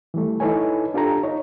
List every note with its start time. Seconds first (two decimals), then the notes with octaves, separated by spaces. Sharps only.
0.14 E3 G3 A3
0.40 D#4 E4 A4 B4 C#5 G#5
0.94 D4 F4 G4 A4 A#5
1.23 D#4 C#5